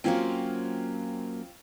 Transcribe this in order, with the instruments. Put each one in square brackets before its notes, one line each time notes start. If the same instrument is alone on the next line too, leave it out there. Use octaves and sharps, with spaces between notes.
[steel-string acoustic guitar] F#3 A#3 C#4 [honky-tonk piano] C4 F4